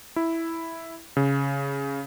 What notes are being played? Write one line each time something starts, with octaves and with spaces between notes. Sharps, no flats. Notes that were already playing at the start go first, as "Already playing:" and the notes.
E4
C#3